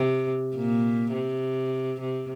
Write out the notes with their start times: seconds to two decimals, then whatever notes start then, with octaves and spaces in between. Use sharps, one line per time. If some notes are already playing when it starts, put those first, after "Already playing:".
Already playing: C3
0.55 A#2
1.13 C3
2.00 C3